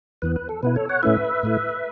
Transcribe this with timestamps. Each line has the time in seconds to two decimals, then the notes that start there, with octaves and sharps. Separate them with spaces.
0.22 E2 E3 B3 B4
0.36 B4
0.49 A4
0.63 B2 B3 E4 B4
0.76 A4 C#5
0.89 C#5 F#5
1.03 A2 A3 C#4 E4 B4 E5
1.43 A2 A3 E4